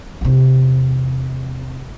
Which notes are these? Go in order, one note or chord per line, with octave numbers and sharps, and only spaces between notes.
E2 C3